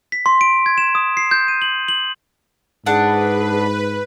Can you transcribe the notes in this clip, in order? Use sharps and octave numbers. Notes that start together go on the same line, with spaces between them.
B6
C6
D7
G#6
E7
D#6
C7
G6
D#7
F#7
F#7
G#2 D4 G#4 B4 F#5